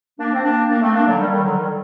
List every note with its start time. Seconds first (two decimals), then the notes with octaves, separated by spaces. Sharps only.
0.19 A#3 D4
0.34 C4
0.45 A#3 D4
0.70 A#3 D4
0.82 A3 C4
0.95 A#3 D4
1.07 D3 F#3
1.19 D#3 G3
1.32 D#3 G3
1.44 D3 F#3
1.57 D#3 G3